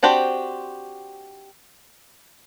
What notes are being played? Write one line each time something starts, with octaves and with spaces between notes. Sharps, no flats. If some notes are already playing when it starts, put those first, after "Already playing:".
C4 D4 F#4 G4 C5